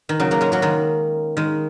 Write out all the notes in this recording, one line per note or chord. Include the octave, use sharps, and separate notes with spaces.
D#3
C#3 F#3
F#3 A#3
G#3 C#4
F#3 A#3
D#3 G#3
D#3 G#3